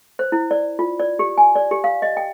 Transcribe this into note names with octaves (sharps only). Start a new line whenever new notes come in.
C5
E4
D5
F4
D5
G4
G#5
D5
G4
F5
D#5
G5